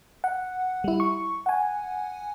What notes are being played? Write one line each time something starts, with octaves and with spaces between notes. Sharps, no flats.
F#5
G3 E4
C#6
F#5 G#5